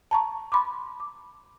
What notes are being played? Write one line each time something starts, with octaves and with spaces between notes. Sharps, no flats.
A5 A#5 C#6
B5 C6 D6
D6